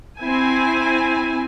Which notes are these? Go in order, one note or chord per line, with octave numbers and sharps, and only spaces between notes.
C4 E4 G#5